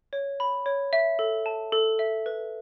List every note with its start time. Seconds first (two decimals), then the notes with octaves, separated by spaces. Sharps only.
0.13 C#5
0.40 B5
0.66 C#5
0.93 E5
1.19 A4
1.46 A5
1.72 A4
1.99 E5
2.26 B4